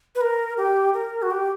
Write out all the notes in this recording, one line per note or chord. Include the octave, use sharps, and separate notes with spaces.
B4
A#4
G4
A#4
F#4
G4